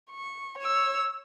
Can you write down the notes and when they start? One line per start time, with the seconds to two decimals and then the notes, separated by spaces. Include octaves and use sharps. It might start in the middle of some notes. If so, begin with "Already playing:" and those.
0.11 C#6
0.58 C#5 E6